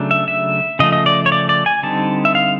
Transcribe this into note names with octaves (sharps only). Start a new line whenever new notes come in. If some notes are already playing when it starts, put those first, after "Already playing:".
Already playing: C#3 F#3 A3 D4
E5
E5
C#3 F3 A3 D#5
D#5
D5
C#5
D5
D5
G#5
D3 G3 C4 D#4 A5
E5
F5